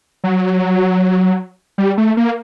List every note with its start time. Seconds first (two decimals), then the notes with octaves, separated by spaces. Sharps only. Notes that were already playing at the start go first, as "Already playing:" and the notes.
0.24 F#3
1.78 G3
1.98 A3
2.17 A#3